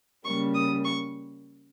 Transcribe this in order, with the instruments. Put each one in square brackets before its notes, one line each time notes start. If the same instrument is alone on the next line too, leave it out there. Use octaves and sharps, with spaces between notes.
[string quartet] C#3 G3 A#3 C#6
D#6
C#6